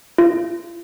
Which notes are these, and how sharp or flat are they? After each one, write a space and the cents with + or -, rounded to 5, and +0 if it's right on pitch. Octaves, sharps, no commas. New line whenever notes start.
F4 -35